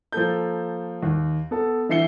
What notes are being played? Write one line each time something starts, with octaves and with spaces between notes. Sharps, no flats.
F3 A#3 A4 G6
D#2
B3 A4
D3 E3 E5 C7 C#7 G7